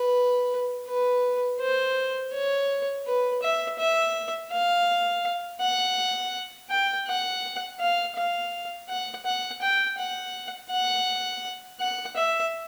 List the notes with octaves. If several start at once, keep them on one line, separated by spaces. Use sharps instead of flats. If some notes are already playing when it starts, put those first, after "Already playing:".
Already playing: B4
B4
C5
C#5
B4
E5
E5
F5
F#5
G5
F#5
F5
F5
F#5
F#5
G5
F#5
F#5
F#5
E5